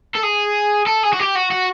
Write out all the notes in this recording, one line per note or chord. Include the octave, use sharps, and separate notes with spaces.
A4
G#4
A4
G#4
F#4
G4
F#4
F#4